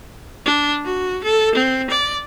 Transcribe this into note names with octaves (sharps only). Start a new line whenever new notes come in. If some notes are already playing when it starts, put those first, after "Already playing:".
D4
F#4
A4
C4
D5